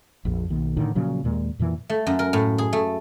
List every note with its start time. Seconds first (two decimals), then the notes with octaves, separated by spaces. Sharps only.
0.25 A#1 F2
0.49 B1 D#3 A#3
0.77 A2 D3 D#3
0.95 A#2 C#3 F3 F#3
1.24 D#2 A#2 G#3
1.59 F2 A#2 E3
1.90 A3
2.07 F#2
2.19 A#4
2.33 A2
2.58 G#4
2.73 A3